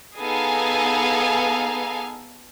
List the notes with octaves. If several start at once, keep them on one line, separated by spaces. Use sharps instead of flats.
B3 D#4 G#4 A4 F5 G#5